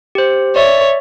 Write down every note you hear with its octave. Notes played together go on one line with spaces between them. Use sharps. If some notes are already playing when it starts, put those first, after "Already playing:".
G4 C5
C#5 D5 E5